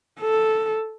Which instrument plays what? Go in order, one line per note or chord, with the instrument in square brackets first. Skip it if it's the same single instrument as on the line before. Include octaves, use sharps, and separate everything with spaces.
[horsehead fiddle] A4